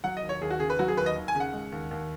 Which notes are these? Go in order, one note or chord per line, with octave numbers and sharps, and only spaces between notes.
F#3 F#5
D#5
D#2
C#5
D#2 G#4
F#4
C#3 G#4
B4
F#3 F#4
G#4
D#2 B4
D#5
D#2
G#5
C#3
F#5
G#3
D#2
D#2